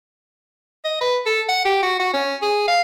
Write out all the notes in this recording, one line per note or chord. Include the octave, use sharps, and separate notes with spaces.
D#5
B4
A4
F#5
G4
F#4
F#4
C#4
G#4
F5